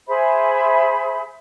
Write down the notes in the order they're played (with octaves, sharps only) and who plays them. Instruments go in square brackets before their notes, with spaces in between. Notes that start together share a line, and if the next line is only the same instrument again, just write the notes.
[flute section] G#4 C5 E5 B5